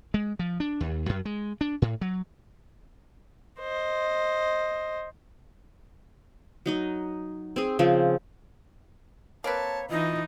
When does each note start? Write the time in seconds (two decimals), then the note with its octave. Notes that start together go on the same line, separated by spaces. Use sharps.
0.14 G#3
0.39 F3
0.60 D4
0.80 D#2
1.09 F#2
1.25 G#3
1.61 D4
1.82 A2
2.01 F#3
3.60 C5 D#5
6.66 F#3 D#4 D#5
7.56 C4 G#4
7.79 C#3 F3 C4
9.44 A#3 C4 B4 C#5 A5
9.90 E3 D#4 F4 D#5